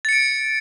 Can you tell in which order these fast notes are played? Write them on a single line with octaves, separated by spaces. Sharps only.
A6 C#7 D7